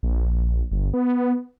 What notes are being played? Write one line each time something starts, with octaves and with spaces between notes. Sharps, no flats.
A#1
G1
B3